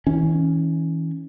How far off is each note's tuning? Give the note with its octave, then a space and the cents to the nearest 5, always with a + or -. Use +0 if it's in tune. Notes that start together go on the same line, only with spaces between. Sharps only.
E3 -35 C#4 +0